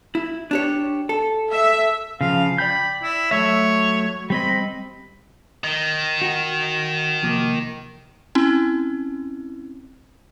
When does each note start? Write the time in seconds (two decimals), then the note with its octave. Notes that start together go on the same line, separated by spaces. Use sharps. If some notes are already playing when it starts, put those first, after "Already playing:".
0.15 E4
0.51 D4 G4 C#5
1.09 A4
1.54 E5
2.21 C#3 F3 F5
2.58 D5 G5 B5 G6
3.03 E4
3.31 F#3 A3 C#5 E5
4.30 G3 C4 D#5 B5
5.64 D#3
6.22 F#4
7.23 C2 F3 A#3
8.35 C4 C#4 E4